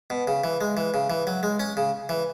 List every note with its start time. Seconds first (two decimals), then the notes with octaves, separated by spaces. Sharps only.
0.10 B2
0.27 C#3
0.44 E3
0.61 G#3
0.77 E3
0.94 C#3
1.10 E3
1.27 F#3
1.43 G#3
1.60 C#4
1.77 C#3
2.09 E3